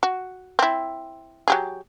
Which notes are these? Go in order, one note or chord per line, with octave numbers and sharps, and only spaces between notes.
F#4
C4 E4
F#3 G4 G#4